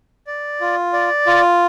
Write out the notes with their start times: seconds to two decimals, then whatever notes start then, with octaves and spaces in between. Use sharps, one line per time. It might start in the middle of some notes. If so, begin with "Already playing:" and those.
0.27 D5
0.61 F4
0.93 D5
1.27 F4